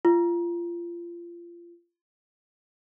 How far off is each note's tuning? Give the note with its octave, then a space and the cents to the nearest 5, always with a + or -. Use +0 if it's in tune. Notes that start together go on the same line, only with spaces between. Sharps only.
F4 -25